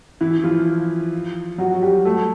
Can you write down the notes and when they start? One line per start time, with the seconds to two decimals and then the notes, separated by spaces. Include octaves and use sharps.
0.21 E3 E4
0.44 F3 F4
1.58 F#3 F#4
1.73 F#4
1.82 G3 G4
2.05 A3 A4